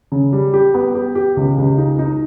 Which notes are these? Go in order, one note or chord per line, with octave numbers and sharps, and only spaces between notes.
C#3
G3
G4
B3
G4
G4
C#2
C#2
D#4
D#4